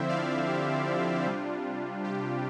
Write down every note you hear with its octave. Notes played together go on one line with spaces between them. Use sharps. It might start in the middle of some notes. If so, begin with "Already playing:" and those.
Already playing: D3 F3 C4 E4 C5 E5
D5 F5
G4
C3 G3 D4 F4
G4